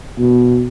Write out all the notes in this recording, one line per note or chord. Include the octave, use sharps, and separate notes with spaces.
B2